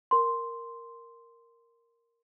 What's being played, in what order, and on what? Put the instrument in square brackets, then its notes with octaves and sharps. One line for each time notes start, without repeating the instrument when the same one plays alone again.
[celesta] A#4 C6